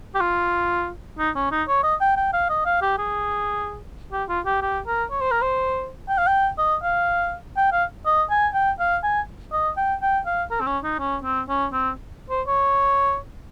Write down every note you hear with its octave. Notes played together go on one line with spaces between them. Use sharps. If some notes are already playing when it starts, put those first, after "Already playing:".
G4
F4
D#4
C#4
D#4
C#5
D#5
G5
G5
F5
D#5
F5
G4
G#4
G4
F4
G4
G4
A#4
C#5
C5
A#4
C5
G5
F5
G5
D#5
F5
G5
F5
D#5
G#5
G5
F5
G#5
D#5
G5
G5
F5
A#4
C4
C#4
D#4
C#4
C4
C#4
C4
C5
C#5